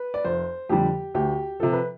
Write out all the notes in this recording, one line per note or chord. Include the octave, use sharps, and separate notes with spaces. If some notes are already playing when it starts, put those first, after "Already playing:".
Already playing: B4
D5
F1 C5
F2 D3 G3 G4
D2 G4
C3 F3 A4
B4